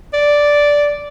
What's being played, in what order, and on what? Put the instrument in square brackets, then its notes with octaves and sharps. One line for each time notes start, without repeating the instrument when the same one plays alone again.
[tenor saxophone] D5